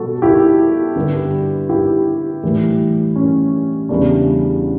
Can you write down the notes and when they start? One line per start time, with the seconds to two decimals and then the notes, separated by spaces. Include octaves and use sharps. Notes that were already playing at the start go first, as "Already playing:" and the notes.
Already playing: B2 G3 F#4 A4
0.22 E4 G4
0.96 G2 D3 G3
1.69 E4 G4
2.43 A2 E3 G3
3.16 C#4
3.89 E2 C#3 E3 G3 D4